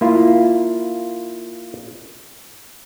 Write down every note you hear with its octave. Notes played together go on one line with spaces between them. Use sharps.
A#3 E4 F4